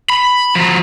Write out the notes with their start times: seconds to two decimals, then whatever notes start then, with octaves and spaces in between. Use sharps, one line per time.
0.10 B5
0.55 F3 F#3